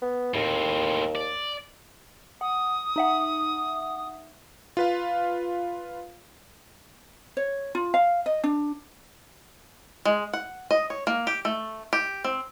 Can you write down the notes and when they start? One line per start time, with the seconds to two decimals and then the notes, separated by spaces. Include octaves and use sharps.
0.02 B3
0.34 D#2 A2 C4
1.15 D5
2.41 F#5 D#6
2.96 D#4 E5 F#5
4.77 F4 B4 F5
7.37 C#5
7.75 F4
7.94 F5
8.26 D#5
8.44 D4
10.05 G#3
10.33 F#5
10.71 D#5
10.90 C#5
11.07 A#3
11.27 G4
11.45 A3
11.93 G4
12.24 C4